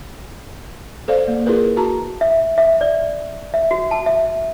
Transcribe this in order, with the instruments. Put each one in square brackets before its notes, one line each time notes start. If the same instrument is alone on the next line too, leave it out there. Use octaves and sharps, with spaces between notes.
[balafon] A4 C5 D5 F5
A#3
E4 F4 G#4 A#4 B4
F#4 A5 A#5
[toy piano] E5
E5
D5
E5
F#4
A5
E5